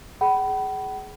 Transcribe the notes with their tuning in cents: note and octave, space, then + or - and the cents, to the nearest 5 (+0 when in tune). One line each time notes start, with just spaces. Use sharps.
G#4 +10 F#5 +45 B5 +0